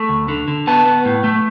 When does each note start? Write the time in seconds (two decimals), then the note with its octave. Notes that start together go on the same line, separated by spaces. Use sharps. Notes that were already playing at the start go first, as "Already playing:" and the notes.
Already playing: A3
0.09 D2
0.28 D3
0.48 D3
0.67 B3 A5
0.85 B3
1.05 A2
1.24 A3